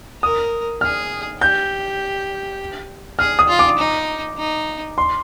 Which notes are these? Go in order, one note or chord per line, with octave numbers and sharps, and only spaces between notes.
A#4 D#6
G#4 F6
G4 G6
G#4 F6
D#6
F4
D6
D#4
D#4
C6